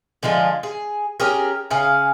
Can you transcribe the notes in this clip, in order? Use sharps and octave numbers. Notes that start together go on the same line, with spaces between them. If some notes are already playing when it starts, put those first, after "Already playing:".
D3 F3 G#3 F4
G#4
C#4 G4 G#4 A#4
C#3 G#4 F5